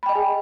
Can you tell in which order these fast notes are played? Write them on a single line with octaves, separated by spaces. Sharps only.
B5 G5 D#5 G#5 G#4